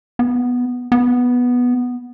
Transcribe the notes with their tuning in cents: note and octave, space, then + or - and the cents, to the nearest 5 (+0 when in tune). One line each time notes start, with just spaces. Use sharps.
B3 -5
B3 -5